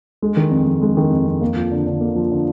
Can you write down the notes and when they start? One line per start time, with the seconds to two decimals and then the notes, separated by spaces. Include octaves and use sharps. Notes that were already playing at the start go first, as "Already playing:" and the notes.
0.22 G#3
0.37 D#3
0.51 F2
0.67 F2
0.82 G#3
0.97 D#3
1.11 F2
1.27 F2
1.41 A#3
1.56 F3
1.71 D3
1.86 D3
2.01 A#3
2.16 F3
2.31 D3